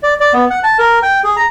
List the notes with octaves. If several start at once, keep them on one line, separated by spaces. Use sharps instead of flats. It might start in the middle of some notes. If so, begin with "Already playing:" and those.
D5
D5
B3
F#5
A5
A#4
G5
G#4
A#5